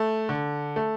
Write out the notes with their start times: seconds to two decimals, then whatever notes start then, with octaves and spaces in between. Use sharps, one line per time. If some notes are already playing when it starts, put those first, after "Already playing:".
Already playing: A3
0.29 D3
0.76 A3